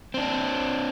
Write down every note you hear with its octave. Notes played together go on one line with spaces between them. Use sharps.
C4 D4